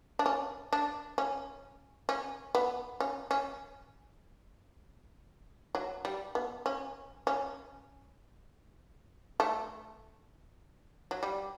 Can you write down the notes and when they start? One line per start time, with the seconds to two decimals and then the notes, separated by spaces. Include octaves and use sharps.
0.19 D4
0.26 C#4
0.73 D4
1.18 C#4
2.09 C#4
2.55 B3
3.00 C#4
3.31 C#4
5.75 F#3
6.05 G3
6.35 B3
6.66 C#4
7.27 C#4
9.40 A3
11.11 F#3
11.23 G3